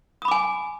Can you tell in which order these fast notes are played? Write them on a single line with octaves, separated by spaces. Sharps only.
D#6 B5 D6 G#5